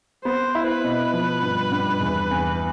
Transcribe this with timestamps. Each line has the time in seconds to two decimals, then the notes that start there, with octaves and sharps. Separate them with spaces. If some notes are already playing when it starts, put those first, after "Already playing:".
0.25 B3 C5
0.55 E4
0.69 B4
0.84 B2
1.13 F3
1.42 G2
1.72 G2
2.01 E2
2.31 E2